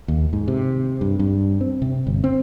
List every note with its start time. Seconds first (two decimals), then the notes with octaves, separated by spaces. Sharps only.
0.08 D#2
0.33 G#2
0.48 C3
1.01 G2
1.19 G2
1.61 C4
1.82 C3
2.07 G1
2.24 C4